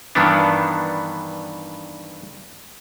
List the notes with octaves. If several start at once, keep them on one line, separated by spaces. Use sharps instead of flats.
G2 D#3 E3 B3 D4